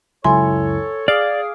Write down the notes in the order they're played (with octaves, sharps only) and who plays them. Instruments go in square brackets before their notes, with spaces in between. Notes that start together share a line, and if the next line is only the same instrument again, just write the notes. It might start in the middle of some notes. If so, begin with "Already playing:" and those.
[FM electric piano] C#2 F#2 E4 [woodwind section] A4 C#5 [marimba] G#5 C6
[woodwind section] G#4 [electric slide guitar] D5 [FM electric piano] F5 D6